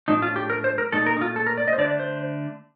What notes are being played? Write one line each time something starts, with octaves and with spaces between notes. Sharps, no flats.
A2 F3 A3 D4 D#4
F4
G4
A#4
C5
A#4
A#2 A3 D#4 A4
A#4
D#4
F4
A4
A#4
D5
D#5
C5
D3 A3 D4 D5
C5